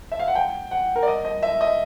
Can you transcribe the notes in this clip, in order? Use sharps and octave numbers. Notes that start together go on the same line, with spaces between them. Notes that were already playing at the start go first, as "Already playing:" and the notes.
E5
F5
F#5
G5
F#5
A#4
D5
D#5
D#5
E5
D#5